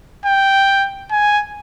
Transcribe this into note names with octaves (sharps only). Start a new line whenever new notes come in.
G5
G#5